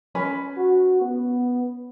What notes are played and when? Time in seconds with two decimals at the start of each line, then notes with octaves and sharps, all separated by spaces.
0.15 C#4 B4 B5
0.57 F#4
1.01 B3